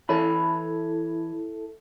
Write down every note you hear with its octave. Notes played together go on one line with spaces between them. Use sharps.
E3 E4 A4 C#5 B5